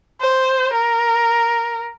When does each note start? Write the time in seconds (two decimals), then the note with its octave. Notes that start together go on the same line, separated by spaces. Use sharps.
0.21 C5
0.73 A#4